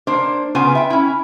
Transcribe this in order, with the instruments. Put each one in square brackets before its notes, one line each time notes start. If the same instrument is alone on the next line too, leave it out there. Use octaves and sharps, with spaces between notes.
[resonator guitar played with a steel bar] A#3 D4 C5
C#3 B3 F4 G#5
E5 G5
C#4 E4